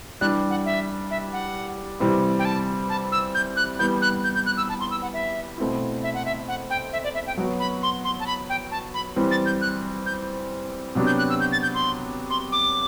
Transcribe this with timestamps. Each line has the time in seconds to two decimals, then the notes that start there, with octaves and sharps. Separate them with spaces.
0.21 E3 G3 D4 G4 F#6
0.50 F#5
0.66 E5
1.11 E5
1.33 F#5
2.00 C3 E3 G3 C4 E4
2.39 G5
2.45 A5
2.90 A5
3.12 E6
3.35 G6
3.57 F#6
3.79 E3 G3 B3 G6
4.02 F#6
4.24 G6
4.35 G6
4.46 F#6
4.57 E6
4.69 A5
4.80 C6
4.91 E6
5.02 F#5
5.14 E5
5.58 B2 A3 C4 E4
6.03 E5
6.14 F#5
6.25 E5
6.48 F#5
6.70 G5
6.93 E5
7.04 D5
7.14 E5
7.27 G5
7.37 F#3 B3 F#4
7.60 B5
7.83 C6
8.05 C6
8.20 A5
8.27 B5
8.49 G5
8.71 A5
8.94 B5
9.16 E3 G3 C4
9.31 A6
9.46 G6
9.61 F#6
10.06 G6
10.95 C3 F#3 B3 D4 G4
11.07 G6
11.18 F#6
11.30 E6
11.40 G6
11.52 A6
11.63 G6
11.74 C6
12.30 C6
12.52 D6